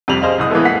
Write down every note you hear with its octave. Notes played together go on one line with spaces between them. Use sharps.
F2 C3 G3 F7 F#7
G#4 C5 D#5 F5
F#1 C2 D#6
E3 G#3 A#3 B3 E4 A4
F#5 B6 C7